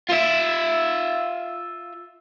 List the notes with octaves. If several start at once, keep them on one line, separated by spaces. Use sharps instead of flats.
F4 E5